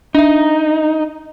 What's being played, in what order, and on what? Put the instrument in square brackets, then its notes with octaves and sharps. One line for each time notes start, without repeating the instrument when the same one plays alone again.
[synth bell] D4 E5 [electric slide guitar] D#4